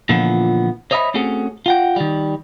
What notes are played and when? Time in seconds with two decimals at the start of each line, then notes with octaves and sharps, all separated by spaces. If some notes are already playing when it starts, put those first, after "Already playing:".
0.09 A#2 D3 E3 F3 B3
0.91 C5 C#5 D#5 E5 A5 B5
1.14 A3 C4 C#4 F#4 G#4 A4
1.66 F4 F#5 G5
1.96 D#3 G3